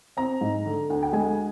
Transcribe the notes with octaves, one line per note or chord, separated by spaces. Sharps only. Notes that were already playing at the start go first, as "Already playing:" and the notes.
C4 A#5
G#2
D3
D2
G5
G#3 G#5